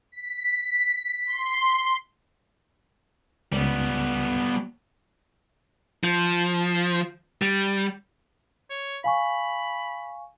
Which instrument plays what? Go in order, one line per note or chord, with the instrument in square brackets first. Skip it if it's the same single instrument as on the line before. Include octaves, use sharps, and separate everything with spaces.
[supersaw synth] B6
C6
[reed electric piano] C#2 [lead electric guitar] G3 B3
[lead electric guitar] F3
G3
[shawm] C#5
[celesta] F5 G#5 C#6 [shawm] B5